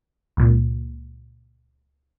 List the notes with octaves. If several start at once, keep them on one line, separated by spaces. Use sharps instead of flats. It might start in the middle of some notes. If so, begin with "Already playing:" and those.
C#2 A#2